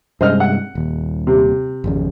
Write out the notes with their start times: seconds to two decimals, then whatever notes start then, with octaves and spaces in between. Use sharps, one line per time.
0.21 G2 C3 G#3 C5 D#5 F6
0.40 F#5
0.75 D#1 D#2
1.27 C3
1.84 G#1 F2 C#3